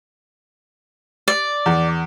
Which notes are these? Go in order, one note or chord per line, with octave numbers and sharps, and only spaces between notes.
D5
E2